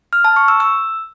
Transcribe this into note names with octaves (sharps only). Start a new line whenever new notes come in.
F6
A5
C#6
E6
E6